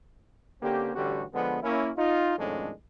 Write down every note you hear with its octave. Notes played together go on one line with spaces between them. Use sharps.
D3 A#3 C4 C#4 G4
A1 D3 G3 C#4 F#4 G4
D3 F3 G#3 B3
A#3 C#4 E4
D#4 F4
F2 A2 D#3 G#3 C#4 D4